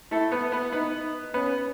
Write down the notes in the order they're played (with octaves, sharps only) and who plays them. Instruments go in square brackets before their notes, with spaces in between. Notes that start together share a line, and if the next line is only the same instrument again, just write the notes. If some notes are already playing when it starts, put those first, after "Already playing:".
[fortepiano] A3 A4 [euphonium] E4
[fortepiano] B3 B4
B3 B4
[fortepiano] B3 B4 [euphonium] D#4
[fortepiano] B3 B4 [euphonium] C#4